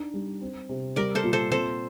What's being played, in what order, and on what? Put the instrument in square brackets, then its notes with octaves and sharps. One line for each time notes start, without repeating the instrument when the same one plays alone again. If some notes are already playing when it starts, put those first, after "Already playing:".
Already playing: [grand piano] D4 D#4
G3
C4
C3
[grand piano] G3 [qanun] A#4 D5
[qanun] A4 C5
[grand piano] A#2
[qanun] A4 C5
[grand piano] C4 [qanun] A4 C5